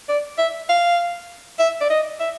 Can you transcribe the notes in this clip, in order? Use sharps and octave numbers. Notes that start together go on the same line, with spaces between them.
D5
E5
F5
E5
D5
D#5
E5